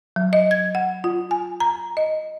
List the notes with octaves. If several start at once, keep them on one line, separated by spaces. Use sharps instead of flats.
F#3
D#5
G#6
F#5
F4
G#5
A#5
D#5